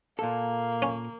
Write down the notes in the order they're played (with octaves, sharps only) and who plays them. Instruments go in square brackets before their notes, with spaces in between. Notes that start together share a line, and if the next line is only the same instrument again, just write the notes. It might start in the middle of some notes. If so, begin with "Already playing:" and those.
[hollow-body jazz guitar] A#2 A4 [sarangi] A#3 [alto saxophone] F5
[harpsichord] C#4